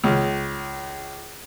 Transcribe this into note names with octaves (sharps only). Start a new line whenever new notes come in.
C#2